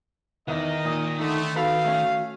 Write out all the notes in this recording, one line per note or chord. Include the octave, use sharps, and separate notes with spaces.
E2 D#3 D#4 A#4 D#5
A#2 D#6
D3 A3 D#4
B3 F#4 A4 F5 B5
A3 C#4